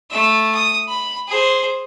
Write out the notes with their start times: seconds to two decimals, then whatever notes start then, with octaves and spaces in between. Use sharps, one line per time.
0.10 A3 E5
0.55 D#6
0.89 B5
1.28 G#4 C5